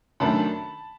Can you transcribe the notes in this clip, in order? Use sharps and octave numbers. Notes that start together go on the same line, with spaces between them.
F#2 D#3 F#3 A3 D4 A5 B5